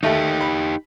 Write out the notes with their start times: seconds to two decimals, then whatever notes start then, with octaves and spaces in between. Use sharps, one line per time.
0.03 D#2 A3 D#4 G4
0.41 B5